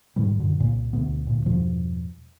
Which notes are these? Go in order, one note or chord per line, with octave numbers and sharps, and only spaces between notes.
G#2 B2 D#3 G3
F#2 B2 D3
C2 A#2 C#3
D2 B2 B3
D2 A#2
E2 G2 B2 F3